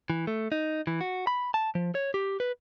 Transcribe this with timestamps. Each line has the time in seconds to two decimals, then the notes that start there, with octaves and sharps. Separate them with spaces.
0.10 E3
0.27 A3
0.52 D#4
0.87 E3
1.01 F#4
1.27 B5
1.54 A5
1.75 F3
1.95 C#5
2.14 G4
2.40 B4